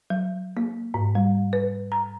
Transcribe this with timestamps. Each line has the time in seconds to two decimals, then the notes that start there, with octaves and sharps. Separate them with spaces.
0.10 F#3
0.57 A#3
0.94 G#2
1.15 G3
1.53 B4
1.92 A#5